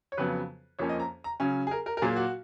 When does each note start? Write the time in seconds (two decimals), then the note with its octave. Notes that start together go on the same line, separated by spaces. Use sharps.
0.12 C#5
0.17 F2 C#3 F#3 B3 B4
0.79 F2 F3 A#3 C#4 C#5
0.89 D#5
1.00 A#5
1.24 A#5
1.40 C#3 F#3 C#4
1.67 G#4
1.71 A#4
1.86 A#4
1.97 A#4
2.02 A#2 F#3 A#3 G#4
2.16 F#4